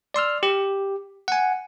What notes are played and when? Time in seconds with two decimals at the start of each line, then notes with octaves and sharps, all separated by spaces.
0.14 D5 C6 E6 F6
0.43 G4
1.28 F#5 G#5